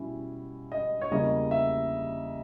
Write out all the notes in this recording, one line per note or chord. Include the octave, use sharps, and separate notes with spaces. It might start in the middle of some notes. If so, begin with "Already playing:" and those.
Already playing: B2 G3 C#4 E4
D#5
C#5
E2 C#3 G3 A#3 D#5
E5